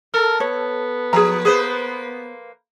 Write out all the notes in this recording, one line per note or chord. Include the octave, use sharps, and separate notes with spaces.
A4 A#4
B3 C#5
F3 G#4 A#5
A#3 G#4 B4 C5